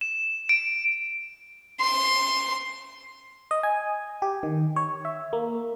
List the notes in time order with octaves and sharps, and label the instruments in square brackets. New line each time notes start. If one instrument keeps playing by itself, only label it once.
[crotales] E7
D7
[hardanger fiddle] C6
[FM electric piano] D#5
G#5
G4
D#3
C#5
E5
A#3